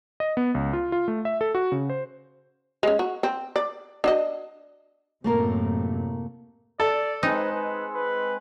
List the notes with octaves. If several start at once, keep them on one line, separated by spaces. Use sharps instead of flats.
D#5
B3
C#2
F4
F4
A3
E5
A4
F#4
C#3
C5
G#3 C#4
F#4
C4
D5
D4 F#4 D#5
F#2 A2 C3 A3 A#3 A#4
A4 D5
G#3 C4 D#4 B4
B4
B4